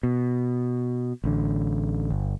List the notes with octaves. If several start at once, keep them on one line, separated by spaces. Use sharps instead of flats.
B2
A1 D3
G1